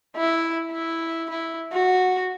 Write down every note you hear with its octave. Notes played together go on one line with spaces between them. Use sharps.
E4
E4
E4
F#4